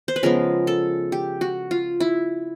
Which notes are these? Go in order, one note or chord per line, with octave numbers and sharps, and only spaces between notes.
C5
B4
C#3 F3 G#3 B3 A#4
A4
G4
F#4
F4
E4